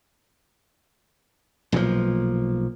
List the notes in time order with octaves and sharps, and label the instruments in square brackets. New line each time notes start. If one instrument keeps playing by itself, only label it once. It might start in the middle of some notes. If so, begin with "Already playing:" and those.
[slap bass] B1 A#2 D#3 F3